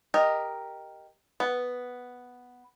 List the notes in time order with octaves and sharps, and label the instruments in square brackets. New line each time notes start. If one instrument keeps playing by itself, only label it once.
[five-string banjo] G4 A#4 D#5
B3